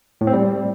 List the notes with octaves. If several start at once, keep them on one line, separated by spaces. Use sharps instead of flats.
A2
C4
G3